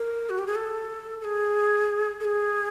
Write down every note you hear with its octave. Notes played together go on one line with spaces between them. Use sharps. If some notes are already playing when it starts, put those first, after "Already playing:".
Already playing: A#4
F#4
G4
G#4
A4
A4
G#4
A4
G#4